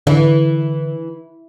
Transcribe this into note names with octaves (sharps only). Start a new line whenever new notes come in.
D3 E3